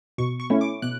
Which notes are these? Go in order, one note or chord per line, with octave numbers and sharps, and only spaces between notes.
B2 C#6
C#6
A3 C#4 E4
D6
B2 F#6